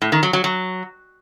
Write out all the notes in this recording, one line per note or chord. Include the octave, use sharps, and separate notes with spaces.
A2
D#3
F#3
F#3
F#3